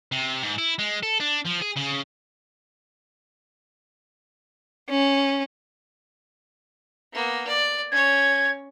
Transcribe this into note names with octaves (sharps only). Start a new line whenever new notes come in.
C3
G#2
E4
G#3
A4
D4
F3
G#4
C#3
C#4
A#3 B3
D5
C#4 C#5 G#6